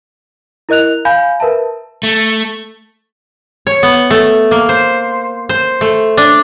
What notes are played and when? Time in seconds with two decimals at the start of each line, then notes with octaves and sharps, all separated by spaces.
0.69 E4 A#4 D#5 F#6 F7
1.05 F5 G#5 B5 G6
1.40 A#4 B4 E5 A5
2.03 A3
3.67 C#5
3.83 B3
4.10 A3
4.51 A#3
4.69 C5
5.49 C5
5.81 A3
6.17 D4